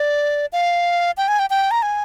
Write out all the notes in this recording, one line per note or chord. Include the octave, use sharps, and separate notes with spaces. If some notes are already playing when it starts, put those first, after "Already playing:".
Already playing: D5
F5
G5
G#5
G5
G5
A#5
G#5